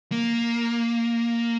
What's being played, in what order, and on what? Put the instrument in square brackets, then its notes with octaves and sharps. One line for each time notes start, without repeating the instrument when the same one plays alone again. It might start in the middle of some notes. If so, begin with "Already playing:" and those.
[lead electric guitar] A#3